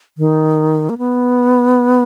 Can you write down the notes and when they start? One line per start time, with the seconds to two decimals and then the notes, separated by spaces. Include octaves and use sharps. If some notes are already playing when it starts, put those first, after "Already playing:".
0.18 D#3
0.89 A#3
0.98 B3